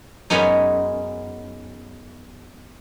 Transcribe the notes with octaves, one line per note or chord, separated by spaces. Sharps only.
F#2 G#3 B3 C#4 D#4